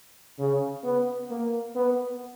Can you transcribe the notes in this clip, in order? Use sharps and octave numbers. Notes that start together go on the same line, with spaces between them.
C#3
B3
A#3
B3